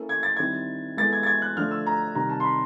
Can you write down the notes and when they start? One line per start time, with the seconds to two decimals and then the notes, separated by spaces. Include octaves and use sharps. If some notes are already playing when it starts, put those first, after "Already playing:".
Already playing: A#3 C#4 E4 A4
0.09 G#6
0.23 A6
0.37 D#3 G3 C4 E4 G#6
0.97 G#3 B3 E4 A4 A6
1.13 G#6
1.23 A6
1.27 G#6
1.42 F#6
1.56 D3 F3 A3 D4 F6
1.71 E6
1.87 A#5
2.15 C3 D#3 G3 C4 A#5
2.29 A5
2.40 C6
2.44 B5